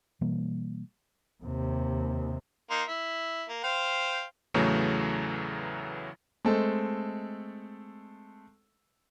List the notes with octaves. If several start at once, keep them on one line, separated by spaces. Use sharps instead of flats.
B2 E3 G3 A#3
D#2 C3
A#3 D#4 C6
E4
A#3
C5 F5 G5
E2 A2 C#3 E3 F#3 A3
G#3 A3 C4 A4